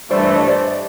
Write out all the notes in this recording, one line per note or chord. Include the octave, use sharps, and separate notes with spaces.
G2 E3 A3 C5 D5
C5 D5
C#5 D#5
C5 D5